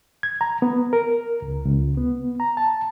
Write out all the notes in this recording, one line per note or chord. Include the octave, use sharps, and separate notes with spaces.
G#6
A#5
B3
A#4
C#2
C#2
B3
A#5
A5